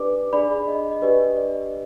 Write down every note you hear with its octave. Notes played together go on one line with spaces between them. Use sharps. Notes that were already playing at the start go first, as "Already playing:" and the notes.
Already playing: D4 G4 B4 D5 D6
D4 G#4 D5 B5
D#5
D5
D#5
D4 G4 B4 D5 D#5
D5